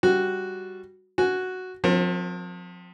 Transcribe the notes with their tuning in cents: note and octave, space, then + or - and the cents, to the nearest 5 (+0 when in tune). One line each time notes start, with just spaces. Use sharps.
G3 +0 F#4 +0
F#4 +0 G#5 +0
F3 +40 C4 +0 A#4 +0